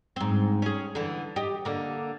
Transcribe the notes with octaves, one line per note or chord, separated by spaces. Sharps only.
G#2 C4
C#4 G#4
D3 E3
G4 D#5
D3 A#3